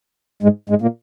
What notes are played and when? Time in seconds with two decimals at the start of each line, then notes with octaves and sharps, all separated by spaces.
0.43 G#2 G#3
0.70 G#2 G#3
0.82 A#2 A#3